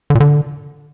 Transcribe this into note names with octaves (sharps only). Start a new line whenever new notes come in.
D3
A#2
D3